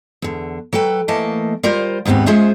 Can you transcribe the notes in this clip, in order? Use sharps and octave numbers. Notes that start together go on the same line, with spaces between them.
E2 D3
F#3 A4 B4 G5
E3 A3 A#3 D#5 A5
G3 F4 A#4 C5
D#2 G#2 G3 B3 C4
G#3 C#4 F4 G#4 C5 E5